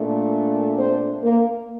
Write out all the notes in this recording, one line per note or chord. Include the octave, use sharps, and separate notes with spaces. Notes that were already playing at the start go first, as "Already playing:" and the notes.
Already playing: A#2 A3 D4
C4 C5
A#3 A#4